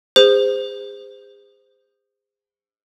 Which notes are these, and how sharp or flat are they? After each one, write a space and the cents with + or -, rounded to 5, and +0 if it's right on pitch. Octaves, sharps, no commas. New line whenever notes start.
G#4 -35 C5 -20